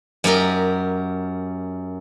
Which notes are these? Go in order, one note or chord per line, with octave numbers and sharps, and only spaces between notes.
F#2 G4 A#4 D#5